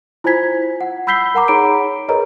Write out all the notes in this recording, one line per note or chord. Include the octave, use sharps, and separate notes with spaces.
E4 F4 C5 G#5 G#6 B6
F#5
B5 E6 G6 B6 C7 G7
A#4 F#5 A#5 D6
D#4 G#4 C#5 A#5 B5 D7
G#4 A#4 B4 C#5 D#5 A#5